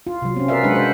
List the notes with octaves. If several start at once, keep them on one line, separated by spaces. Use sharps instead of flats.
F4
C3 F#3
C4 C#4
F#4 A#4 B4 D5 E5 F5
F#3 G#3 D4 B4 F#5
C5